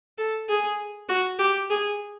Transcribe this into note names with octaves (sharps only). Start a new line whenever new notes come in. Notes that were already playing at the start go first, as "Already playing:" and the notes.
A4
G#4
F#4
G4
G#4